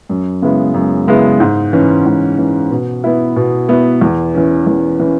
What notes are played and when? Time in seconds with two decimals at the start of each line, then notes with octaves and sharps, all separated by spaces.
0.09 F#2
0.42 C#3 G#3 B3 E4
0.74 F#2
1.07 C#3 G#3 B3 E4
1.40 G#2
1.73 E3 C#4
2.05 G#2
2.38 E3 C#4
2.71 B2
3.04 B3 E4
3.36 B2
3.69 B3 E4
4.01 E2
4.34 E3 C#4
4.67 E2
5.00 E3 C#4